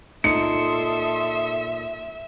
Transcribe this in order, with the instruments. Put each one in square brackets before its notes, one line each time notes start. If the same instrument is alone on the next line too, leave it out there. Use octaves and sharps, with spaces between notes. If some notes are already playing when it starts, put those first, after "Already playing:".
[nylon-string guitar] A#2 D#4 [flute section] A4 C6 D#6 [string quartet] E5 [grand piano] C#7